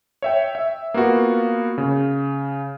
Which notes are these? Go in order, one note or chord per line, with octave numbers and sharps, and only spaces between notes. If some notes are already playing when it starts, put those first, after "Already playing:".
C#5 E5 G5
E5
A#3 B3 F4 F#4
C#3